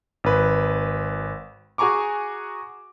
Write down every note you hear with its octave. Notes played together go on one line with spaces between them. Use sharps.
G#1 B4
F#4 G#4 G#5 A#5 C#6 D6